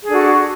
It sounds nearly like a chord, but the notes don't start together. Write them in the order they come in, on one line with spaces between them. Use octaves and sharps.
G#4 D4 A4 F#4